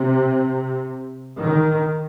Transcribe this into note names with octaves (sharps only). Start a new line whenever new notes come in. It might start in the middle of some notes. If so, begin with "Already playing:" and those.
Already playing: C3
D#3